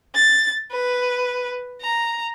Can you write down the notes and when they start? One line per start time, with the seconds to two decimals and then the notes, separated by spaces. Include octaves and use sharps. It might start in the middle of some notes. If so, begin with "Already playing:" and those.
0.15 A6
0.72 B4
1.81 A#5